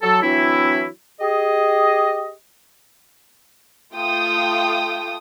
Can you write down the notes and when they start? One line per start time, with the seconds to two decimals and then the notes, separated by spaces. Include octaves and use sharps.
0.02 F#3 A4
0.22 E3 F#3 C4 D4 E4
1.20 G4 G#4 D#5
3.95 A3 F4 G5 D#6